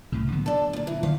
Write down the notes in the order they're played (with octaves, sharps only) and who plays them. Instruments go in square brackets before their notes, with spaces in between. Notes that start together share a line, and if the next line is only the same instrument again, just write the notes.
[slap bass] C2 A2 C#3
D3 F#3 B3
[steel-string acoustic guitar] D4 A4
D#2 A#2
E3
[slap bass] D3 D#3 [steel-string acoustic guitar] F5